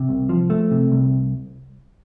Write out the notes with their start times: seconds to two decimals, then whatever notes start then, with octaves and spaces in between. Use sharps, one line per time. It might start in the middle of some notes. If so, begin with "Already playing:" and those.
Already playing: C3
0.09 C2
0.29 F3
0.50 A3
0.71 C3
0.92 C2